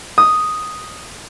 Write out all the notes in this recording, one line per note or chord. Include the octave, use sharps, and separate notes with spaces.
D#6